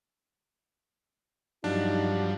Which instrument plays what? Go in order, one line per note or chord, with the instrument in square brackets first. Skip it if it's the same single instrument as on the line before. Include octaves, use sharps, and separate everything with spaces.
[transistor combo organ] G2 F3 F#3 [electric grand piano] D4 [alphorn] D#4 [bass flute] G4